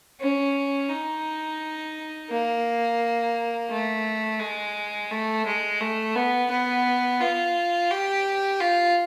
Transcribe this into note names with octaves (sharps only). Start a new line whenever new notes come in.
C#4
D#4
A#3
A3
G#3
A3
G#3
A3
B3
B3
F4
G4
F4